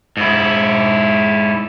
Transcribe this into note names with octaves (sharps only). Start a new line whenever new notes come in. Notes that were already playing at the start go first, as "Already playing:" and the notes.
G#2 E4